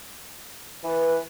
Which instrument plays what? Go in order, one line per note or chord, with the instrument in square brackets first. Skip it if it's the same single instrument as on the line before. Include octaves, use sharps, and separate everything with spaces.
[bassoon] E3 [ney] B4